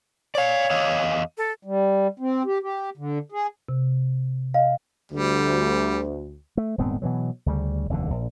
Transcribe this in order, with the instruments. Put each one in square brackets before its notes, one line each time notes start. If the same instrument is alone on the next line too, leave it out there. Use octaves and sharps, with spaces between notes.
[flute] C#5 [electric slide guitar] D5 F5
[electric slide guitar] E2 D#5 F5
[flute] A4
[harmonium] G3
C4
G4
G4
D3
G#4
[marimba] C3
[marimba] D#5 [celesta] F5
[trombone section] D2 [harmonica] G3
[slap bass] A3
D#1 G#2 B3 C4
B2 E3 F#3
D2 C#3 G3
F1 D#2 A2 D3
A#1